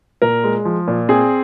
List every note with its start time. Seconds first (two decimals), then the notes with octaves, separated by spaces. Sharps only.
0.22 A#2 A#4
0.44 G#3
0.65 F3
0.88 A#2
1.09 C4 G#4